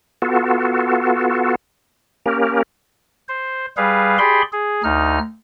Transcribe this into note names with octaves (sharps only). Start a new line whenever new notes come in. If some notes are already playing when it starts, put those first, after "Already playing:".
B3 F4 F#4 A4
A#3 C#4 G4 A#4
C5
G3 G#4 B4 F5
G4 G#4 D5 B5 C6
G#4
D2 D#4 F6